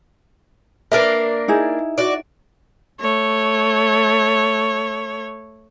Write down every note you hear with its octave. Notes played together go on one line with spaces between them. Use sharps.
A#3 D4 A#4 B4 E5
D#4 E4 G#4
F#4 D5
A3 C#5